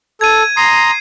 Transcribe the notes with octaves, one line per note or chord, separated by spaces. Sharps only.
A4 G#6 D#7
A#5 C6 D#6 C7